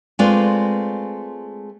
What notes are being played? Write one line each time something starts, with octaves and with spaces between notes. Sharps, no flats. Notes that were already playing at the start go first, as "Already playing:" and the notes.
G#3 A3 C4 F4 B4 D5